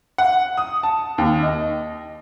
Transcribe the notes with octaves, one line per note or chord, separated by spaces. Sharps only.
F#5
D#6
A5
D#2
D#5